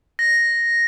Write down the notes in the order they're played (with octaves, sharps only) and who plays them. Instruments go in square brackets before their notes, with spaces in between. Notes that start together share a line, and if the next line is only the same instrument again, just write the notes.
[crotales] A#6